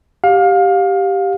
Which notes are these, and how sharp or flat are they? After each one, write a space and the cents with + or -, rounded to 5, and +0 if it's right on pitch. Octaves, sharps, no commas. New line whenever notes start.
G4 +0 F5 +25